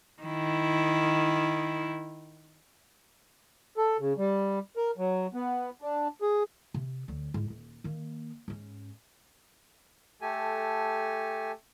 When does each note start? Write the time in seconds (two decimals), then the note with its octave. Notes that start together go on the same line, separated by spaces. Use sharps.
0.22 D#3 E4
3.77 A4
3.99 C#3
4.18 G3
4.77 A#4
4.97 F#3
5.34 B3
5.82 D4
6.22 G#4
6.74 C3
7.08 D2 F#3
7.34 G#2 E4
7.50 D#1
7.84 D#3 A#3
8.48 G#2 C#4
10.21 A3 G4 A4 G#5